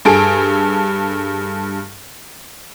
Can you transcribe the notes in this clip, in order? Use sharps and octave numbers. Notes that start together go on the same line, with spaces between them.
G2 G#4 A4 D7